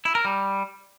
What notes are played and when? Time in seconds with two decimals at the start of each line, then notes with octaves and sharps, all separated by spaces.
0.05 E4
0.15 A#4
0.25 G3